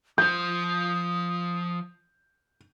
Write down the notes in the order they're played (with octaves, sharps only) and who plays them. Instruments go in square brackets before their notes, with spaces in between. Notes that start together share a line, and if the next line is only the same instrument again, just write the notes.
[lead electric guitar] F3 C5 [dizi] D#6 [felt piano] G6